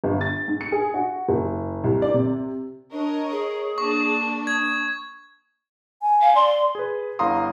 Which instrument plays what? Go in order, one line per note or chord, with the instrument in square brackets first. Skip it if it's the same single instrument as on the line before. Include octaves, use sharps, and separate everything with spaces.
[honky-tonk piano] G1
A6
G#2
C#7
G#4
F#4
F#1
C2
D5
C3
[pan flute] D4 [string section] A#4 C#5 D#5
[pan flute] G#4
[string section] A#3 D4 [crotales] C#6
[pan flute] D#6 [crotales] G#6
[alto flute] G#5
[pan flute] F5
[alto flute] D5 [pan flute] C6
[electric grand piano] G#4 B4
G1 E4 F5 A#5 C6 D#6